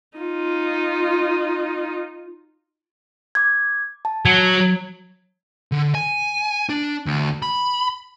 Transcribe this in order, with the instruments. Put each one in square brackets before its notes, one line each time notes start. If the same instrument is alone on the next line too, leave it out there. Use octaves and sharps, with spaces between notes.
[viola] D#4 F4
[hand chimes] D6 G#6
A5
[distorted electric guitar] F#3 [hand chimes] G#6
[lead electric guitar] D3
G#5
D4
D2
B5